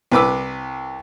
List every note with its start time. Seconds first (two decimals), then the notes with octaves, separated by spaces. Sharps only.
0.12 C2 B4 D6 E6